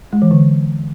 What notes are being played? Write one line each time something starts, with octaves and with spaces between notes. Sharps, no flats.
G#3
E3
D3